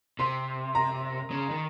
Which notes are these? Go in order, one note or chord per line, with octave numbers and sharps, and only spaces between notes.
C3 C6
A#5
C#3
D#3